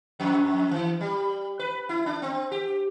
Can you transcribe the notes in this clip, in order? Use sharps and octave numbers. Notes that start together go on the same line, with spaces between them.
F2
E3
G3
B4
E4
D4
C4
G4